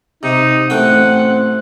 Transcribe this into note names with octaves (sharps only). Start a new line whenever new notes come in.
C3 D#4
A1 A3 C4 F#5 G5